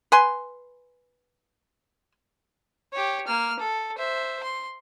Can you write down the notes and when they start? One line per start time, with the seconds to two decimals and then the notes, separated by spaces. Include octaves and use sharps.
0.12 B4 G#5 C6
2.93 G4 C#5
3.27 A#3 F6
3.59 A4
3.98 C5 E5
4.43 C6